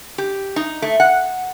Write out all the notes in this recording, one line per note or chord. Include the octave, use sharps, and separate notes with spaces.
G4
D#4
A3
F#5